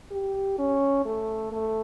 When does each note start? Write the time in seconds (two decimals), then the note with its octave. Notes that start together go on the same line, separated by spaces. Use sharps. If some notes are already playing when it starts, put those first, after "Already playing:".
0.12 G4
0.59 C#4
1.05 A3
1.52 A3